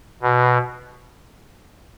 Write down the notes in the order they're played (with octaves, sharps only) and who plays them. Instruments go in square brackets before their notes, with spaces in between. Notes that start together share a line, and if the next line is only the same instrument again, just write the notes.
[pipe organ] B2